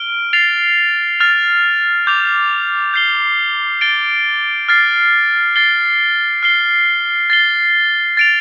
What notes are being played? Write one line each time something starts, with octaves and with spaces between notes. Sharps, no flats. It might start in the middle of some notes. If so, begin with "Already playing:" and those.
Already playing: F6 D7 G7
A6 C7 F7
F6 A6 F7
D6 G6 F7
G6 C7 G7
A6 D7 G7
F6 A6 C7
A6 C7 G7
F6 C7 G7
A6 C7 G7
A6 D7 F7